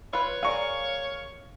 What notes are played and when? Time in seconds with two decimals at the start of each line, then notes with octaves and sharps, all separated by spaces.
0.13 F4 B4 C#5
0.43 G#4 A#4 D5 F5 C#6